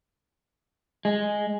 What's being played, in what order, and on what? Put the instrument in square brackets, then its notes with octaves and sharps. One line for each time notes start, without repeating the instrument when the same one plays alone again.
[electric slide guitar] G#3